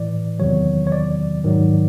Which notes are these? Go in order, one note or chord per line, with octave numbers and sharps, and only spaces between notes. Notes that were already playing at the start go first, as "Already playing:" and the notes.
Already playing: A2 E3 D5
E2 C3 D#3 F#3 C#5
C#5
D5
G#2 D#3 F#3